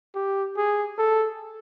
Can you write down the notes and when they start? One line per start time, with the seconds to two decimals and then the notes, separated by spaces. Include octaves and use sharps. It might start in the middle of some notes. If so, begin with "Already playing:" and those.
0.15 G4
0.57 G#4
0.98 A4